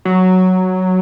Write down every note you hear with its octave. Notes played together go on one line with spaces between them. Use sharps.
F#3